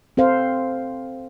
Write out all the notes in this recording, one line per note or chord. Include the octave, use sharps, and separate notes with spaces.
C4 A4 C5 F5